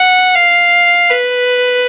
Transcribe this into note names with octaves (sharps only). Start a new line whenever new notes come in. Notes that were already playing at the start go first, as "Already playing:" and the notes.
Already playing: F#5
F5
B4